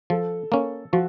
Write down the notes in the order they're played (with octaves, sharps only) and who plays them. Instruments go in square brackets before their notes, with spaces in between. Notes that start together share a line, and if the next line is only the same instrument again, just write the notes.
[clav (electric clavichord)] F3 [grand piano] A4
[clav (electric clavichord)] A#3 C#4
[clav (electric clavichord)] F3 [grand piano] F#4